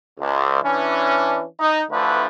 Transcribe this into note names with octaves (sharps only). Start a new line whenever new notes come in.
C#2
E3 C#4 D4
D#4
D2 D3 E3 F3 A3 B4